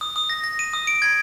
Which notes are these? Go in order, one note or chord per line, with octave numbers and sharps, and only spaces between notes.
D#6
D#6
A#6
A#6
D#7
D#6
D7
G#6